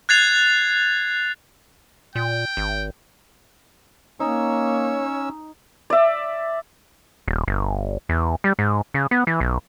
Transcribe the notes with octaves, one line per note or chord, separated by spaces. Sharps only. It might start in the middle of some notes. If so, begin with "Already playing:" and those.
F#6 G#6 A6 C7 F7
A#2 G5
G#1
A#3 C#4 D#4 C#5 E6
D5 E5
D#1
G1
E2
G3
G#2
C#3
B3
E3
B1